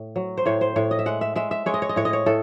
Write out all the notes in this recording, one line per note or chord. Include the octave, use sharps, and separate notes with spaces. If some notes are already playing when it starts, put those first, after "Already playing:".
Already playing: A2
F#3
C5
A2 C#5
C5
A2 C#5
D#5
E5
G#3 F#5
E5
G#3 E5
E5
G#3 C#5
D#5
C#5
D#5
A2 C#5
D#5
C#5
A2 A4